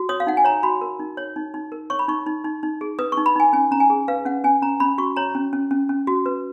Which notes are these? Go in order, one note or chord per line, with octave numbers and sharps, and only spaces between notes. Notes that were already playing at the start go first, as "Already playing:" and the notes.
Already playing: F#4
C#5 D#6
F5
D#4 F#5
G#5
C#5 A#5
F#4 B5
A#4
D#4
C#5
D#4
D#4
A#4
C#5 C#6
B5
D#4 C#6
D#4
D#4
D#4
G#4
B4 D#6
C#6
D#4
B5
D#4 G#5
C#4 G#5
C#4 A#5
G#5
G#4
B4 F5
C#4 F#5
C#4 G#5
C#4 A#5
C#4 B5
F#4 C#6
C#5 A#5
C#4
C#4
C#4
C#4
F#4
B4